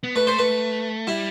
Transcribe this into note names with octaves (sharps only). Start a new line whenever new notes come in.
B3
A3 B4
C5
B4
G3 E4